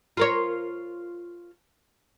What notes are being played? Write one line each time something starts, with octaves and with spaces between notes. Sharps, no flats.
F4 A#4 C#5